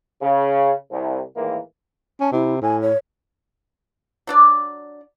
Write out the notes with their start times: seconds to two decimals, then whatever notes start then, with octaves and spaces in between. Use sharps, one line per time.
0.22 C#3
0.91 C2
1.37 A2 D#3 E3 G#3 A#3 E4
2.20 C#4 A5
2.32 C3 E4
2.61 A2 G#5
2.81 C#5
4.27 F#3 D4 D5